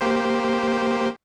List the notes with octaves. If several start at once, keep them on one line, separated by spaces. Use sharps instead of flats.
A#3 G4 C5